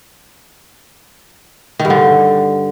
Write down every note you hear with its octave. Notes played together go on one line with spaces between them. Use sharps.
D#3
G2
D3